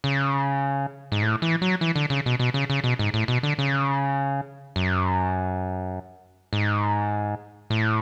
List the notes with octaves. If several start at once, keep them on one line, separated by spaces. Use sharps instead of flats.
C#3
G#2
A2
E3
F#3
E3
D3
C#3
B2
B2
C#3
C#3
B2
G#2
A2
B2
D3
C#3
F#2
G#2
A2